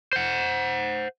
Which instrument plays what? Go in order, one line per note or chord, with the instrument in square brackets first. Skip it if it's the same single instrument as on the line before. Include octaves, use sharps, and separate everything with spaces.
[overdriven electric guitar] C5 F#5